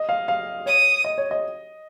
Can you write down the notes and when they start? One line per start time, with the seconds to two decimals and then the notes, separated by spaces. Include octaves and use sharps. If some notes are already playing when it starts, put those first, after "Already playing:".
Already playing: D#5
0.09 F5
0.28 F5
0.66 C#5 D#6
1.04 D#5
1.18 C#5
1.31 D#5